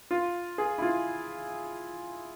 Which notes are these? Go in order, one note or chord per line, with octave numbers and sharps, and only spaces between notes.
F4
G#4
E4
F4